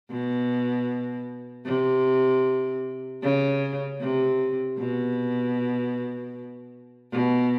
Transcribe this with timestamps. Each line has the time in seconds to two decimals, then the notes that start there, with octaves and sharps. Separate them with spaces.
0.10 B2
1.66 C3
3.22 C#3
4.00 C3
4.78 B2
7.12 B2